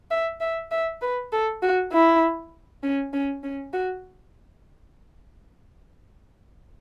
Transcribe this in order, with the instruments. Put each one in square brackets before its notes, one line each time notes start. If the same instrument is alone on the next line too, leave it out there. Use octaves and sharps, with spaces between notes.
[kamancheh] E5
E5
E5
B4
A4
F#4
E4
C#4
C#4
C#4
F#4